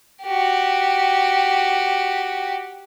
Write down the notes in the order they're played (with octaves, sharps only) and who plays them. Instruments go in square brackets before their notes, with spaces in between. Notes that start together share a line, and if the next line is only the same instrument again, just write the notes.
[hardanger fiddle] F#4 G4